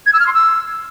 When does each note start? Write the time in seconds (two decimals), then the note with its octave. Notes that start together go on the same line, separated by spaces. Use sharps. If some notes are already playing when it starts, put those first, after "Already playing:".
0.06 G#6
0.13 E6
0.19 F6
0.26 C6
0.33 E6